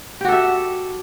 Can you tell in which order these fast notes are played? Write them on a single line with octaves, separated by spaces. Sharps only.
G4 F#4 A4 E5